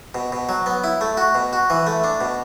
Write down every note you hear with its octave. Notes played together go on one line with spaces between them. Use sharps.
B2
B2
F#3
B3
E4
A3
F#4
B2
F#4
E3
A3
D4
B2